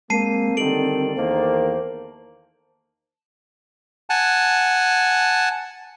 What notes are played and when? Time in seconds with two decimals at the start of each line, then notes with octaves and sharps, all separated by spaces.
0.10 G#3 A#3 C4 A5 C7 D#7
0.57 D3 D#3 G3 A4 D7 F#7
1.16 E2 D#3 A#3 C5
4.10 F#5 G#5 A5